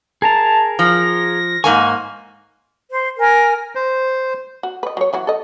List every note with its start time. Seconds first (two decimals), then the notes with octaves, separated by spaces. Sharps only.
0.22 G#4 A#4 A5 A#5
0.79 F3 A#6
1.64 G#2 A#3 G#5 C#6
2.90 C5
3.18 A#4 G#5
3.75 C5
4.63 F#4
4.83 B4 D#5
4.97 F#3 C#5
5.13 E3 F#3 F#4
5.27 A4 D#5